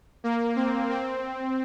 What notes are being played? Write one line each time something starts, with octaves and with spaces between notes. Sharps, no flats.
A#3
C4
C4